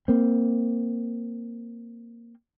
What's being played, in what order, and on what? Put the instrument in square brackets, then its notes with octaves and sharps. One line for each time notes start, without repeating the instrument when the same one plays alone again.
[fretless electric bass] A#3 C4